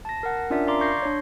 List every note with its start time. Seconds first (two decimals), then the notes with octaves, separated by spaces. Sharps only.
0.05 A5 A#6
0.23 A#4 F#5
0.50 C#4 D4 F4 A#4 D5 E5
0.67 D5 F5 A#5 C6 D6
0.80 C6 C#6 G6 A#6 C7
1.02 D4 C#5